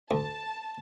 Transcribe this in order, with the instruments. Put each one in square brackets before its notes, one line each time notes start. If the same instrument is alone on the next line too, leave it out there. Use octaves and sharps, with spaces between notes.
[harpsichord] D2 [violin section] A5